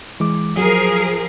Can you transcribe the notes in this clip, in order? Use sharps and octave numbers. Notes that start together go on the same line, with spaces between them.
E3 G#3 D6
F3 F#3 G#4 A#4